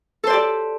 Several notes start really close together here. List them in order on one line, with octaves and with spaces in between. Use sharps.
A4 C5 D5 G4